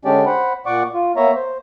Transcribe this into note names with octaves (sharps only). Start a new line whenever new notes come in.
D3 G#3 C#4 D4 G4 D5
C5 F#5 B5
A#2 D5 F#5 C#6 D6
F4
A#3 B3 C#5 E5 A#5
C5